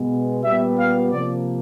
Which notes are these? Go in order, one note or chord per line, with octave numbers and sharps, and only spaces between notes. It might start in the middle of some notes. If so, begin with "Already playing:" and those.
Already playing: B2 G#3 B3
A#2 G3 B3 E5
F5
C3 F3 A#3 D5